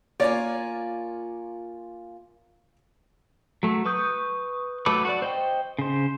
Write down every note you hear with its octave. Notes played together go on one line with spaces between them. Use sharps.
A#3 F4 C#5 D5 G#5
F#3 A3
B4 C#6 D#6 G6
F#3 A3 A4 B4 D6
F#4 D5
C5 D#5 G5
C#3 C5